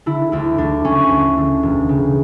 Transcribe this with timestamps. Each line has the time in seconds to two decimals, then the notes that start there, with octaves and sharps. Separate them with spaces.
0.06 D3 E4
0.32 D2 E4
0.58 D2 D4
0.85 D2 C#4
1.11 D2
1.38 D3
1.63 E1
1.89 C#3